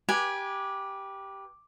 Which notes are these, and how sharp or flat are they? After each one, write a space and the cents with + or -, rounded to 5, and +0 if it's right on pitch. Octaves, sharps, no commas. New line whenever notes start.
G4 +0 B4 -35 G#5 +0